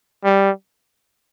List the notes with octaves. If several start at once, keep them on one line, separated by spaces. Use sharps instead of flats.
G3